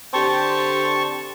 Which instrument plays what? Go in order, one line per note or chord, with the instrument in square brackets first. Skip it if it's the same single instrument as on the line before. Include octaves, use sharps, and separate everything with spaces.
[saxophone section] D3 C4 G4 [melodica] A5 C#6